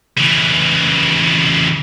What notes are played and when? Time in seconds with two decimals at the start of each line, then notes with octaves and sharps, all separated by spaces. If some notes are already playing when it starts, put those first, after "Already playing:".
0.18 C#3 E3